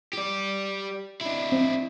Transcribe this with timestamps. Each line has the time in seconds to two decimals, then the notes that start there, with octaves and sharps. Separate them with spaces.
0.13 G4 D5
1.21 D4 E4
1.52 C4